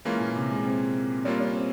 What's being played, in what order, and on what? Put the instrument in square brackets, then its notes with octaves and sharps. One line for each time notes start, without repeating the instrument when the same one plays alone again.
[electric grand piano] E3 A#3 C#4 F4 [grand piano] G#3
[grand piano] A#2
C3
G#3
C4
[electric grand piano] C3 G3 A#3 F4 [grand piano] C#4
[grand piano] C#4
C4